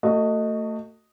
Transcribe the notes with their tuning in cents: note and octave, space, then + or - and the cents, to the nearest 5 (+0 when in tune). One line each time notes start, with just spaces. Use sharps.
A3 +30 F#4 +0 D#5 +0